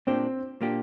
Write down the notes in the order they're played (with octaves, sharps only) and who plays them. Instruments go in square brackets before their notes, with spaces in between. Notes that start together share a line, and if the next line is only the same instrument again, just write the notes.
[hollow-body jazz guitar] A#2 A#3 D4 G4 [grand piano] C4
[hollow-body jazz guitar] A#2 A#3 D4 G4